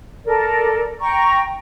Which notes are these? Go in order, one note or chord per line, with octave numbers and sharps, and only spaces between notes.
A4 A#4 D5
G5 A#5 C#6